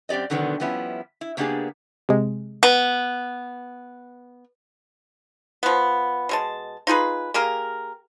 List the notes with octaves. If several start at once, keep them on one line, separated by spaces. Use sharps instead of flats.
F#2 C4 G4 D5 D#5
B2 D3 D#3 F#3 A3 B3
F3 G3 B3 C#4 E4
E4
C#3 A#3 B3 D4 G4 G#4
C3 G#3
B3
F3 B3
B2 G#3 A5
D#4 F4 G#4 B4
A#3 G4 G#4 A#4